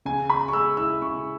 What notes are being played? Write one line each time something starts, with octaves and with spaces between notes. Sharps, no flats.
C#3 G#5
C#4 B5
C#6
G#3 E6
E4 E6
C#3 C#6